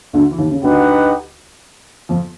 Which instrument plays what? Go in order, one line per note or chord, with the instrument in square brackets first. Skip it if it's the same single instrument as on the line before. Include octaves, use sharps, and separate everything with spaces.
[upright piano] D2 D3
E3
D#2 D#3
C#3
[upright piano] D2 D3 [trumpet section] D#4 G4 B4 D#5 F#5
[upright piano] F2 F3